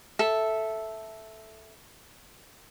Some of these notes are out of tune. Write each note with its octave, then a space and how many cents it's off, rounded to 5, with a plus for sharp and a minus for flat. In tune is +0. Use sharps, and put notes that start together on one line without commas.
A4 -5 E5 +0